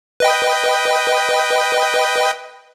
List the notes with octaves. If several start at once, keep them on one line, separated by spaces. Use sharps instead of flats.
B4 D#5 G5